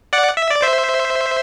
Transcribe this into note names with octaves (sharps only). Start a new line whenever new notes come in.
D5 F#5
E5
D5
C5 E5